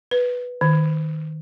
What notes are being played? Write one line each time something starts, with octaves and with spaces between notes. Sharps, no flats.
B4
D#3